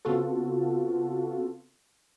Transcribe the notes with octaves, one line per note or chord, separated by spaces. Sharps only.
C#3 B3 C4 F4 F#4 A4